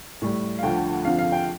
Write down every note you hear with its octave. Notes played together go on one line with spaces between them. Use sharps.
A2 G3
F5
D2 D3 F3 G5
F2 D3 F3 F5
F5
G5